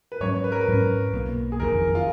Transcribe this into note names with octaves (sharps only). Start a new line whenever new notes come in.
B4
G#2 F#3 C#4 C#5
B4
A#4
B4
G#2 F#3 C#4
B1 B2 A#3
G#4
F#1 F2 D#3 A#4
F4